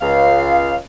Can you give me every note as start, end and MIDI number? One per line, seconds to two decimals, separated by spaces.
0.01 0.76 37
0.01 0.76 77